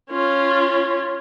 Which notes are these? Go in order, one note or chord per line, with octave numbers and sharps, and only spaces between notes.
C#4 F4